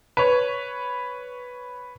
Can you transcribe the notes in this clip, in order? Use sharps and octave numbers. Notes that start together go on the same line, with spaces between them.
B4 C#5